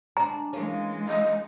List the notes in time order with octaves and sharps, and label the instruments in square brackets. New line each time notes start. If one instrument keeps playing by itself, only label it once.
[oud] G#3 D4 [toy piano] A#5
[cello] E3 G#3 [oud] A#3 C#4
[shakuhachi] D#5